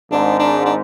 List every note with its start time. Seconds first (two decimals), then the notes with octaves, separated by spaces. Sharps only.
0.11 G#1 G#2 D4
0.39 D4
0.65 D4